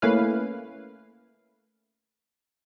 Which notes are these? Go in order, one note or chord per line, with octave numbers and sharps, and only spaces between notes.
A3 A#3 C#4 E4 B4 F5